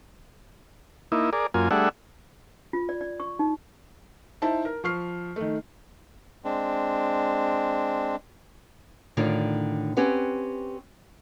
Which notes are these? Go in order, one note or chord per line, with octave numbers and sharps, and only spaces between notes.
A#3 D#4 E4
G#4 A#4 D5
F#2 A#3 F4 G#5
G3 A3 D4 G#4 E5 F#5
F4
D5
D5
C#6
D#4
D#4 E4 C5 A5
A#4
F3 C#6 F6 C7
D#3 A3
G#3 C4 D4
A2 D3 D#3 D4 F4
C4 C#4 G4 B4 F#5